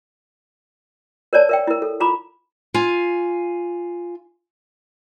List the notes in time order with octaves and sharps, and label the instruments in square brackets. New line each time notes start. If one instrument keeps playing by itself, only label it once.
[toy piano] A#4 C#5 D5 A5
A#4 E5 G5
E4 A#4
A4
F4 A#5 B5 D6
[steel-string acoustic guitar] F4 G#5